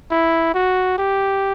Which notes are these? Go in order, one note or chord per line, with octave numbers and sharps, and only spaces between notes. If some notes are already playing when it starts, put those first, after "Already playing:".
E4
F#4
G4